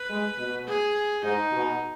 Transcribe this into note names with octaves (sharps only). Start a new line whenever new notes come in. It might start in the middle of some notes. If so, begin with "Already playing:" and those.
Already playing: B4
G#3
B2
G#4
G#2 D#4
B2